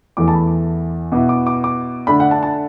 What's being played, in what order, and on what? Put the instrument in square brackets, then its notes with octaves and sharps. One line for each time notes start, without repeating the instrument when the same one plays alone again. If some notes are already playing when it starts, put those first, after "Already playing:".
[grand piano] E2 E3 A3 D6
A5
B5
B2 B3 E4 D6
D6
D6
D6
D3 A3 D4 B5
F#5
A5
A5